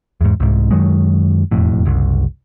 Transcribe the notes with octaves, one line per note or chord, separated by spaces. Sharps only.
E2 G#2
C2 G#2
F#2 D#3 F#3 G#3
E1 F2 A2
F#1 C2